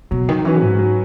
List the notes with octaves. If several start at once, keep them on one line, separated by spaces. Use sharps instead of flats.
B2 F#3
D#3
E3 C#4 F#4 B4
G#2
F#3